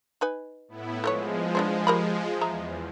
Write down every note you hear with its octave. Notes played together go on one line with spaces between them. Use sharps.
D#4 B4 G#5
A2 B3 E4
F3 G#3 A4 B4 C#5
B3 D4 C5
G4 A#4 B5
E2 G#4 E5 A#5